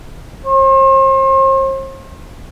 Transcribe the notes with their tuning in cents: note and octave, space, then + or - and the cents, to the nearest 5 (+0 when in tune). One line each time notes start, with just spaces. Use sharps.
C5 +40